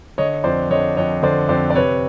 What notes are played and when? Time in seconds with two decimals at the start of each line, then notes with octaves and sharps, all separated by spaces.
0.18 D3 C#5 D#5
0.44 F2 C5 D5
0.70 D3 C#5 D#5
0.97 F2 C#5 D#5
1.23 D3 C5 D5
1.49 F2 C5 D5
1.70 D5
1.75 C3 B4 C#5